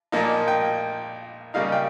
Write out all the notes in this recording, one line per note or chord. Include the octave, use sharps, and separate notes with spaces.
A#2 F3 A#3 D#4
G5
C#3 G3 A#3 D#4 F5
G5